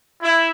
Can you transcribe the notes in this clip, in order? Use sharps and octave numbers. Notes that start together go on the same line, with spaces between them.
E4